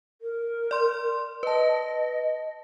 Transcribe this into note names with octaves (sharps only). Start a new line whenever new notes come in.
A#4
D5 C6
B4 D#5 A5